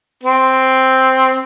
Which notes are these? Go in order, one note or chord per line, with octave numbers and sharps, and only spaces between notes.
C4